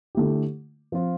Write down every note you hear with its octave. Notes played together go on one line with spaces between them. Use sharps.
D3 A3 E4 G4
F3 C4 F4